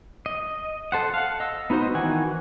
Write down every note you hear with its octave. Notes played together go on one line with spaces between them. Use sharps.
D#5
A4 C5 F#5
F5 F#5
D#5 E6
B3 D#4 F#4 C5 D#5
D#3 E3 F#4 F#5 G#5